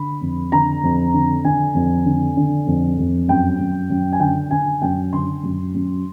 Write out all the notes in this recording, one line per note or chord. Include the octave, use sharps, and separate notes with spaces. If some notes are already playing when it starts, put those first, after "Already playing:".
Already playing: D3 B5
F2
D3 A#5
F2
D3
D3 G#5
F2
D3
D3
F2
F2
F#2 G5
F#2
F#2
G#5
D3 G5
D3 G#5
F#2 G5
D3 C6
F#2
F#2